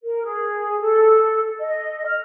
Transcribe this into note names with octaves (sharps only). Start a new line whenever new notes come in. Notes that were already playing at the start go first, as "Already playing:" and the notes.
A#4
G#4
A4
D#5
F6